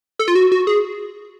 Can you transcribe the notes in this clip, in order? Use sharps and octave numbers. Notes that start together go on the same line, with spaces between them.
A4
F4
F#4
F#4
G#4